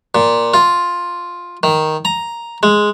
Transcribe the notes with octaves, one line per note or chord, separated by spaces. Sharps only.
A#2
F4
D#3
A#5
G#3